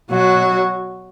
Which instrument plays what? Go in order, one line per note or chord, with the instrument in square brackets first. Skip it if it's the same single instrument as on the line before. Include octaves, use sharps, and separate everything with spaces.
[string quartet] B2 F#3 F#4